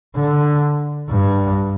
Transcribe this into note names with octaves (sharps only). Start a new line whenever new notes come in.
D3
G2